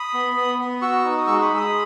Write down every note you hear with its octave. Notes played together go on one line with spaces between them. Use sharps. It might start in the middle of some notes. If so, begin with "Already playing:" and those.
Already playing: B5 D#6
B3
B3
B3
F#4 C#6 E6
D#4
D#6
G#3 C#6 E6
B5 D#6
G#3 E6
B5 D#6